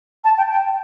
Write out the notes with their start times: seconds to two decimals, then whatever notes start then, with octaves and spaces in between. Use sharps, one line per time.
0.24 A5
0.37 G5
0.51 G5